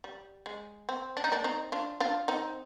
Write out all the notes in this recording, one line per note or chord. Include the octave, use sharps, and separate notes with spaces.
G3
G#3
C4
D4
D#4
A#3 D4
C4 D#4
D4 F4
D4 F4
C4 D#4